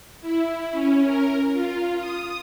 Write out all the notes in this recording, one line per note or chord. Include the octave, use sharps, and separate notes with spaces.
E4
C#4
A#4
F4
D#6